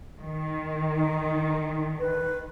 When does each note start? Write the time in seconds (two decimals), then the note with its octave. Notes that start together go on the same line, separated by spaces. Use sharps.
0.21 D#3
0.95 D#4
1.99 B4